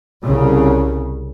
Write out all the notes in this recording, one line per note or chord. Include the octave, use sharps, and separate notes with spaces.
C2 C#3